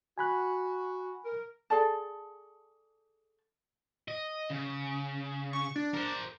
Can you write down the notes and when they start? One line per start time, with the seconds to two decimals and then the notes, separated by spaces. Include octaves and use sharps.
0.18 F#4 G#5 B5 F#6
1.25 A#4
1.70 G#4 A4 D5 A5
4.08 D#5
4.50 C#3
5.53 C#6
5.76 D4
5.94 A#4 C5